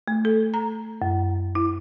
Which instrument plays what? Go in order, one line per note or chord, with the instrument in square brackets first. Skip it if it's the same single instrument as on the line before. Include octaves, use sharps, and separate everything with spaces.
[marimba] A3
A4
A#5
F#2
E4